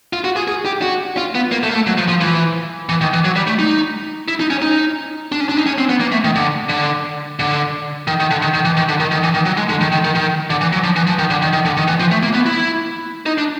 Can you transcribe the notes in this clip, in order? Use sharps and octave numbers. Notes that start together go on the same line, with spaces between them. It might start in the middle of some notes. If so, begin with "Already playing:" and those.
F4
F#4
G#4
G#4
G4
F#4
F4
B3
A#3
A3
A#3
A3
F#3
F3
F3
E3
E3
D#3
E3
F#3
G3
A3
D#4
E4
D#4
C#4
D#4
D4
C#4
D4
D#4
C#4
C4
B3
A#3
A3
D#3
D3
D3
D3
D#3
D#3
D3
D#3
D#3
E3
D#3
D3
D#3
D#3
E3
D#3
F#3
G#3
D3
D#3
D#3
D#3
D#3
D3
E3
F#3
F3
E3
F3
D#3
D3
D#3
D#3
D3
D#3
E3
F3
A3
A#3
B3
E4
D#4
D4